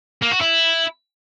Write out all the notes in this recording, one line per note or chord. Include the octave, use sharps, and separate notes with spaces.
A#3
F#4
E4